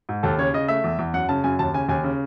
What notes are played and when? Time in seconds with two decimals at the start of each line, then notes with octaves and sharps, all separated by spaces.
0.09 G#2
0.23 D#2 A4
0.38 C#3 C#5
0.54 C#3 D#5
0.68 A3 E5
0.84 E2
0.99 E2
1.13 F#2 F#5
1.29 C#3 A5
1.44 F#2 G#5
1.59 D#2 A5
1.74 C#3 G#5
1.89 D#2 G#5
2.04 C#3